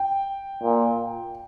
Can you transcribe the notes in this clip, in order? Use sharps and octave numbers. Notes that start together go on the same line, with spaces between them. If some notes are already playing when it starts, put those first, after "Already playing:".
Already playing: G5
A#2